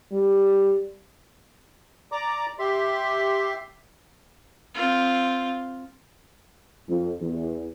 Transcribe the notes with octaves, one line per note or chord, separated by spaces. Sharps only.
G3
D5 A#5 D6
G4 E5 C6
C4 F4
F2
E2